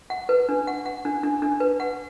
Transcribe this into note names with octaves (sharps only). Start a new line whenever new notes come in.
F#5
B4
D4
F#5
F#5
D4
D4
D4
B4
F#5